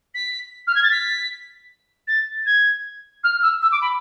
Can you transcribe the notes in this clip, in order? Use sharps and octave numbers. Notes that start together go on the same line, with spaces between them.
B6
F6
G#6
A6
B6
A6
G#6
F6
E6
E6
D6
B5